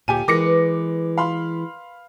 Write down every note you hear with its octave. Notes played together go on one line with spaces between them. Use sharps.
D2 A#2 G4 G#5 D#7
E3 G#3 A#4 D6 A#6 C#7
B4
F5 B5 C6